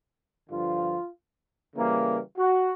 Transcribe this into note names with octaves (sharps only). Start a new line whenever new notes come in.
G2 D3 F3 F4
C#3 E3 G3 A#3
F#4